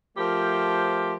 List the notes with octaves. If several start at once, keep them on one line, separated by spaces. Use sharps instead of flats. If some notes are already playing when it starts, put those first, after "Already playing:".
F3 A3 G4 A#4 C5